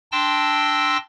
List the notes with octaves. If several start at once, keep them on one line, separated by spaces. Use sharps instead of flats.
D4 G5 A5 C6 E6 A#6